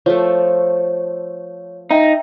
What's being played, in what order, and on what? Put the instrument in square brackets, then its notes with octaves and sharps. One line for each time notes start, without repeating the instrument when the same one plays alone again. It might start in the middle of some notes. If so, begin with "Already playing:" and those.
[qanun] F3 A3 [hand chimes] C#5
[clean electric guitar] D#4 [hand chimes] E5 G5